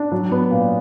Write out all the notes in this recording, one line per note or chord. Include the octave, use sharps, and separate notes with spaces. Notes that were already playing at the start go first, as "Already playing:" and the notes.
Already playing: D4
F#3
B3
A#2